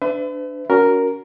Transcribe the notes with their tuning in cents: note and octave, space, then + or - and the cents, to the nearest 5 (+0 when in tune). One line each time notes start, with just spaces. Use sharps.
D4 +0 B4 +40 E5 +0
C#4 +30 F#4 +0 A#4 +0